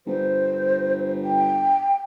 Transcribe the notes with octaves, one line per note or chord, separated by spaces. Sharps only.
G1 C5
G5